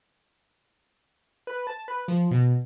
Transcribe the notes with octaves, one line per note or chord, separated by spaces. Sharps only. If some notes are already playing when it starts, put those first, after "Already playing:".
B4
A5
B4
F3
B2